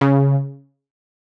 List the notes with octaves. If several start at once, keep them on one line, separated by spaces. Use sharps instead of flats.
C#3